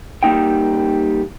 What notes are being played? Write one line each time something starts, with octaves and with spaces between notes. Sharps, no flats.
G3 A#3 D#4 G5